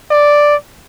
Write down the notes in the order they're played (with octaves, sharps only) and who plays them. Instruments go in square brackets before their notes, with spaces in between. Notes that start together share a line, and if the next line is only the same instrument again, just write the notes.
[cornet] D5